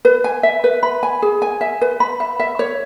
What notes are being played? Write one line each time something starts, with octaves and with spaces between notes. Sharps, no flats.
B4
G#5
E5
B4
B5
G#5
G#4
G#5
E5
B4
B5
E5
E5
C#5